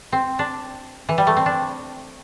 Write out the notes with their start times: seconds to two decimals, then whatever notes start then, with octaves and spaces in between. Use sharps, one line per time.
0.12 C4
0.39 D4
1.09 E3
1.18 G3
1.27 A3
1.36 C4
1.46 D4